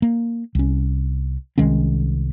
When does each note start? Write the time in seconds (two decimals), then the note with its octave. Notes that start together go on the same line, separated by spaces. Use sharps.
0.02 A#3
0.55 C2 C#4
1.58 C2 D#3 G#3 C#4